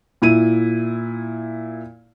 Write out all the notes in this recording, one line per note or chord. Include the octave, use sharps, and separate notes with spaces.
A#2 E4 D#7